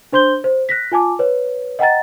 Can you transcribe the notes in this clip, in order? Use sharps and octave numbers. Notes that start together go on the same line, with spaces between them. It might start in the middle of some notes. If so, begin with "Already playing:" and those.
D4 C5 C6 G6 G7
C5
F#6 A#6 B6
F4 G#5 A5 D6
B4 C#5
D#5 F#5 G5 A#5 A6